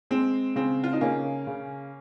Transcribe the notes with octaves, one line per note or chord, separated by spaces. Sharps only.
G#3 C4
C#3 C4
F4
D#4
C#3 A#3 C#4
C#3